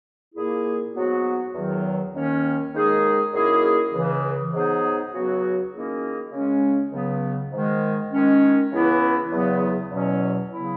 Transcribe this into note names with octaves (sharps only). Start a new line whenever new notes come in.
A#2 A#3 E4 G#4
G#2 F#3 B3 F#4
E2 D#3 F#3
D#2 D#3 A#3 C#4
D#2 D#3 G#3 D#4 G#4
F#2 D#3 A#3 E4 G#4
C#2 C#3 E3
G#2 F#3 B3 D#4 G#4
C#2 C#3 F#3 B3 F#4
D#3 A#3 C#4 E4 G#4
C#3 G#3 C#4
C#2 C#3 F#3 B3
G#2 D#3 G#3
D#3 G#3 C#4
C#2 C#3 E3 B3 E4
E2 C#3 F#3 B3
E2 B2 F#3 C#4
C#3 F#3 B3 E4